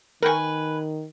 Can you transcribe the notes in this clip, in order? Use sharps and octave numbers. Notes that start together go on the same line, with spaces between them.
D#3 A#4 B4 G5 G#5 C#6